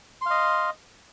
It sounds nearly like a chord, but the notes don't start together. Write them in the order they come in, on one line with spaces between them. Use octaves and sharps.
C6 F5 D#5